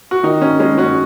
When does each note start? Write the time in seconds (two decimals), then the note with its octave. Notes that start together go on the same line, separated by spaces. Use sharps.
0.11 F#4
0.23 D#3 D#4
0.42 C#4
0.60 G#3 C#4
0.78 C#4 F#4